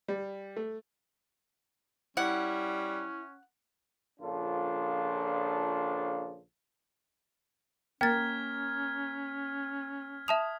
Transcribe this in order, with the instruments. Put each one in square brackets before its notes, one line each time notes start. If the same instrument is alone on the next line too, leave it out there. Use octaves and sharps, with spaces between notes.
[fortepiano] G3
A3
[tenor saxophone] G3 [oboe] C#4 [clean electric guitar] E4 [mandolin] F#5
[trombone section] A#1 C#3 F3 D4 F4 A4
[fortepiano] A#3 [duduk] C#4 [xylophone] G5 A6 [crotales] F6 G#6 B6
[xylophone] E5 A5 F7 [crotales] D#6